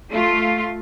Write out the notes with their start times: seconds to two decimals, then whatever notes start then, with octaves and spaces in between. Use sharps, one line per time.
0.12 A3 F4